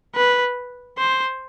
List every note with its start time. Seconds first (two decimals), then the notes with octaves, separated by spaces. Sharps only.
0.16 B4
0.98 C5